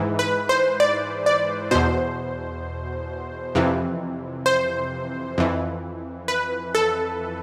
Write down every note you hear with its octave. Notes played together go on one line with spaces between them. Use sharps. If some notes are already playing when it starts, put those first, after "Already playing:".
Already playing: G#2 E3
B4
C5
D5
D5
E2 B2 C5
F2 C3 E3
C5
F2 E3
B4
A4